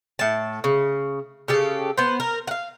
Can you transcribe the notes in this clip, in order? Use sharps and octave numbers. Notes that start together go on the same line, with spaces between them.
A2 A5
C#3
C#3 G4 A4
B3 C5
A#4
F5 F#5